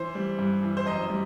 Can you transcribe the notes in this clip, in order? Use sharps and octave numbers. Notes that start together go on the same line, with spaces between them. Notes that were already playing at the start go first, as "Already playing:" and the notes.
Already playing: E3 C5
G3
G2
E3
C5
F#2 D#5
G3